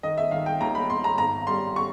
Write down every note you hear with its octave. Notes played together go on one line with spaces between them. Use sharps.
D#3 D#5
E5
D#3 F5
G5
D#2 A#5
B5
D#2 C6
A#5
G#1 A#5
G3 C6
C#6